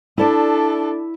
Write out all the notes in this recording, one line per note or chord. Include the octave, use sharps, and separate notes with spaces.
D4 E4 A4 D5 E5